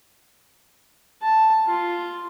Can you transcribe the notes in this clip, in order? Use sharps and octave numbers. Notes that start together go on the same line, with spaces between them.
A5
F4